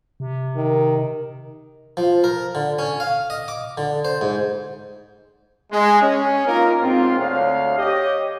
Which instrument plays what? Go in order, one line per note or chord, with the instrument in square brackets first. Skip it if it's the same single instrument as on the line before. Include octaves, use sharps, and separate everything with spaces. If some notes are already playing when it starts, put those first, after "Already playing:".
[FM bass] C3
[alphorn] D#3
[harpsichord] F3
A#4
D3
C#4
F5
D#5
D6
D3
C5
G#2
[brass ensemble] G#3
C#4
A#3 D#4 F4 A#4
G#2 A#3 C4 F4
D2 C#5 F5
G4 C#5 D#5